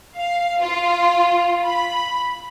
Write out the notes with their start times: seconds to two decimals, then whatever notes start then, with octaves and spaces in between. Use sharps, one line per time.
0.15 F5
0.59 F4
1.64 B5